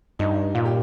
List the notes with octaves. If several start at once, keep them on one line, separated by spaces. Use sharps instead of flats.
G2 D#4
A#2 F4
G4